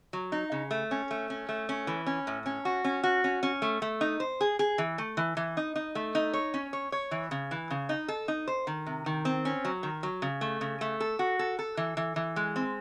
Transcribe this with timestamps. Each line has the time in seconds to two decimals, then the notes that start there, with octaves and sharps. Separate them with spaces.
0.13 F#3
0.32 D#4
0.52 C#3
0.71 A3
0.91 C#4
1.11 A3
1.30 C#4
1.49 A3
1.69 C#4
1.87 E3
2.06 C#4
2.27 A2
2.46 C#4
2.65 F#4
2.84 C#4
3.04 F#4
3.24 C#4
3.43 C#4
3.62 A3
3.82 A3
4.01 D#4
4.20 C5
4.41 G#4
4.59 G#4
4.78 E3
4.98 A3
5.17 E3
5.37 E3
5.57 D#4
5.76 D#4
5.95 A3
6.15 D#4
6.33 C#5
6.54 C#4
6.73 C#5
6.92 C#5
7.11 E3
7.31 C#3
7.51 E3
7.71 C#3
7.89 D#4
8.08 A4
8.28 D#4
8.48 C5
8.67 D#3
8.86 C3
9.06 D#3
9.25 C4
9.45 C#4
9.65 F#3
9.83 D#3
10.03 F#3
10.22 C#3
10.41 A3
10.61 C#3
10.81 A3
11.00 A4
11.19 F#4
11.39 A4
11.59 A4
11.77 E3
11.97 E3
12.16 E3
12.36 G#3
12.56 C4